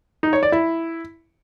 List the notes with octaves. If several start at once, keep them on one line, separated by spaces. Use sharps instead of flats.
D#4
C#5
D5
E4